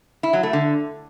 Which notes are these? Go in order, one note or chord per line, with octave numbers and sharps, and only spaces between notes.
E4
F#3
A3
D3